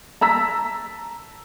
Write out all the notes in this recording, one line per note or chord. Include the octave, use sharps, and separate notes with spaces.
A5 A#5 E6 B6